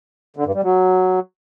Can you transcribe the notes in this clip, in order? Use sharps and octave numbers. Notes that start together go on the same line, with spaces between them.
D3
G2
G3
F#3